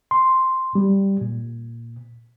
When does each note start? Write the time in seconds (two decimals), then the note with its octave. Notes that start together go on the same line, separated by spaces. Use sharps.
0.11 C6
0.75 G3
1.21 A#2